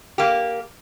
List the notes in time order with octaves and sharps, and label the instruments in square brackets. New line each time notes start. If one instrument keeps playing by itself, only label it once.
[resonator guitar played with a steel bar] A#3 G4